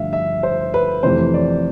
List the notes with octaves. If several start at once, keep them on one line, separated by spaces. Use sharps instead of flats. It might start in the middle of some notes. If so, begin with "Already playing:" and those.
Already playing: G2 D3 F3 A3 E5 F5
E5
C5
B4
F2 C3 E3 A3 C5
D5